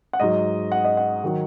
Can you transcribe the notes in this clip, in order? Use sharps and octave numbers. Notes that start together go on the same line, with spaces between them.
F#5
G#2 F#3 D#5
F#5
D#5
F#5
D#3 F#3